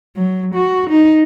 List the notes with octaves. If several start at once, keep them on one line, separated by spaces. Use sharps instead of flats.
F#3
F#4
D#4